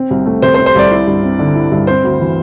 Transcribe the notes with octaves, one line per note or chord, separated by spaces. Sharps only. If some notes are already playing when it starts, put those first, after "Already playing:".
Already playing: C4
C2
A3
C3 C5
C5
C4
C5
C2 D5
E4
G2
C4
D3
E4
G2
C4 C5
D2
E3